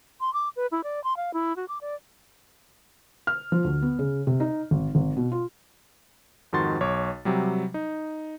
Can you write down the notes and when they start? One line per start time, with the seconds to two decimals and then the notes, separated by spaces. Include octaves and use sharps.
0.21 C6
0.34 D6
0.56 B4
0.72 E4
0.84 D5
1.04 C6
1.17 F5
1.34 E4
1.56 F#4
1.69 D6
1.81 D5
3.27 F6
3.52 F3
3.64 D2
3.82 B3
3.99 C#3
4.27 C3
4.40 D#4
4.71 G#1
4.95 G#1
5.17 B2
5.32 F4
6.53 F2 G#2 D#3 F#4 C6 A6
6.81 B1 C#5 D6
7.25 C3 F#3 G3
7.74 D#4